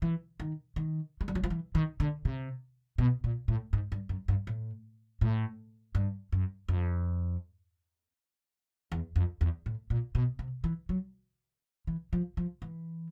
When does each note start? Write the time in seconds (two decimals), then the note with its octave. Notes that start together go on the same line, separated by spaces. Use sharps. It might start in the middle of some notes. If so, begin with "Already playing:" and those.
0.02 E3
0.40 D#3
0.76 D#3
1.21 G#3
1.28 G3
1.35 F#3
1.44 F3
1.50 E3
1.75 D#3
2.00 D3
2.25 C3
2.98 B2
3.24 A#2
3.48 A2
3.73 G#2
3.92 G2
4.09 F#2
4.28 G2
4.47 A2
5.21 A2
5.95 G2
6.32 F#2
6.68 F2
8.92 E2
9.16 F2
9.41 E2
9.66 A2
9.90 A#2
10.15 B2
10.39 C3
10.64 E3
10.89 F#3
11.87 E3
12.13 F3
12.37 F3
12.62 E3